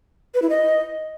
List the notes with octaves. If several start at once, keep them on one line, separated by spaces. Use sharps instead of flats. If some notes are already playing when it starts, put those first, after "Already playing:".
B4
E4
D#5